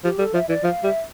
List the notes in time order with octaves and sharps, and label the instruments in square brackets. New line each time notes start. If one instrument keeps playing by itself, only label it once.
[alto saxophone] F3 [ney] G4
[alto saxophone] G3 [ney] A4
[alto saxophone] F3 [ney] E5
[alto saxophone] E3 [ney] D5
[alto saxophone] F3 [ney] F5
[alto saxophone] G3 [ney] E5